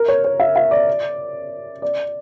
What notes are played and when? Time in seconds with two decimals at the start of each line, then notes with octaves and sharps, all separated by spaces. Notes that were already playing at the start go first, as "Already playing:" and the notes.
Already playing: A#4
0.08 C#5
0.24 C#5
0.40 E5
0.56 E5
0.71 D5
1.82 D5